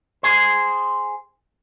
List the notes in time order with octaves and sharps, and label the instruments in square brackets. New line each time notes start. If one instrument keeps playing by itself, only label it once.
[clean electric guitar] G#4 C5